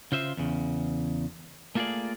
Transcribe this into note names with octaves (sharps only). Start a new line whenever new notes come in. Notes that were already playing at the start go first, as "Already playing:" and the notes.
C#3 F4 C5 E5
E2 C#3
A3 A#3 F4 F#4 G#4 D5